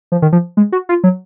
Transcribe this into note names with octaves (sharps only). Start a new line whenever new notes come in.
F3
D#3
F3
G#3
F#4
F4
F#3